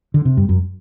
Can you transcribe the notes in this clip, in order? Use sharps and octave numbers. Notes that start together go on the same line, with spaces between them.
D3
C3
G2
F#2